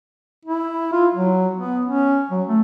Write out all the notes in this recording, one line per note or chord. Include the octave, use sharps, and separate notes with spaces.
E4
F4
F#3
B3
C#4
F#3
A3